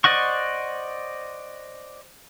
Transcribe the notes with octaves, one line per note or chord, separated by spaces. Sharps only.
C5 D5 D#5 F#5 C#6